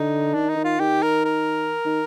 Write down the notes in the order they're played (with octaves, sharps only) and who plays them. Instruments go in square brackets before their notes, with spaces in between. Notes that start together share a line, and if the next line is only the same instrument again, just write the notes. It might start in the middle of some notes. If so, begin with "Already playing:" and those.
Already playing: [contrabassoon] D3 [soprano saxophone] D#4
[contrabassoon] D#3 [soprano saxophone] D4
[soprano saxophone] D#4
[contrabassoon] D#3
[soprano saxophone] F4
[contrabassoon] D#3 [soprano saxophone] G4
[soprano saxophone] A#4
A#4
[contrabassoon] D#3